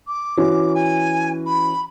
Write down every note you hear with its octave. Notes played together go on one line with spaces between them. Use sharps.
D6
E3 C#4 F#4
G#5
B5